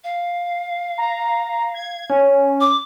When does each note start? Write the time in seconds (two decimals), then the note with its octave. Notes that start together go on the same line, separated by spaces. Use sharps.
0.04 F5
0.98 A#5
1.74 G#6
2.10 C#4
2.61 D6